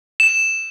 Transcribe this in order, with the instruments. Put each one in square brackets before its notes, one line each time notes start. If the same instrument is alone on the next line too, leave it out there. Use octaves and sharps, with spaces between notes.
[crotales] E7